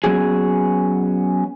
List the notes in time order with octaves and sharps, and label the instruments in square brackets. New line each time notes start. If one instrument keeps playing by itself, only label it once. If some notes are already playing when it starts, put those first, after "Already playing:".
[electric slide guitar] F#3 B3 C#4 F#4 G#4